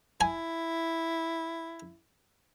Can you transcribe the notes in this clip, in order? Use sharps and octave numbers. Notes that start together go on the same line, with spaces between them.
E4 G#5